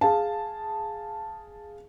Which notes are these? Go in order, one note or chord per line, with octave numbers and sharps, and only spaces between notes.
G#4 F5 A5